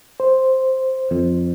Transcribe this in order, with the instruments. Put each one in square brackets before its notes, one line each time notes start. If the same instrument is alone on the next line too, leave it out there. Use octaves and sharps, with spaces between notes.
[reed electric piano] C5
[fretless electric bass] F2